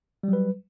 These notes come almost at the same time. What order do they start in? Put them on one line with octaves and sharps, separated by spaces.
G3 F#3 B4